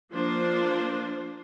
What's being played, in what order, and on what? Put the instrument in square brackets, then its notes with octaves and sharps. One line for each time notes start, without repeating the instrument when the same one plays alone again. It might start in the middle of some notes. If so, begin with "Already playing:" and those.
[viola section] F3 A#3 D4 F4 C5